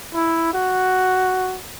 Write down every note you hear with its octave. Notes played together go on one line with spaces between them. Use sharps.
E4
F#4